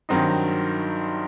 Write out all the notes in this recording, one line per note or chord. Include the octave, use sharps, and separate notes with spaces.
G2 D#3 F#3 C4 D#4